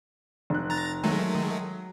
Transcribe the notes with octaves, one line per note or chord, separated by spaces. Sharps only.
F1 F#6
A#5 A6
D#3 F#3 G#3 A3